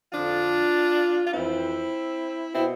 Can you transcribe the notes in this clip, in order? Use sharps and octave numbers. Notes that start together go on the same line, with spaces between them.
F2 D3 F3 D4 F4
F4
F2 E3 C4 E4
B2 C4 E4